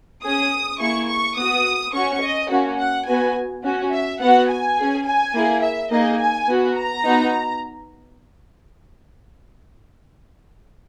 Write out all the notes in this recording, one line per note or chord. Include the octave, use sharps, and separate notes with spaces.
C#4 G#4 D#6
A#3 E4 G#4 C#6
C#6
B3 F#4 D#6
C#4 F#4 C#6
D#5
A#3 C#4 F#4
F#5
B3 F#4 G#5
C#4 F#4
E5
B3 F#4 F#5
G#5
C#4 G#4
G#5
A#3 E4 G#4
E5
A#3 D#4 G#4 D#5
G#5
B3 F#4
A#5
B3 D#4 F#4